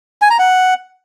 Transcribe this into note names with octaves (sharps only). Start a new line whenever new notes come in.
G#5
A#5
F#5